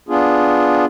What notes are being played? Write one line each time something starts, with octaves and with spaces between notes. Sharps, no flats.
B3 D4 F4 G#4